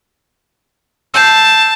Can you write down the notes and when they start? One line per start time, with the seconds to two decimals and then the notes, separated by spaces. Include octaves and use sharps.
1.14 A5 E6 G6 C7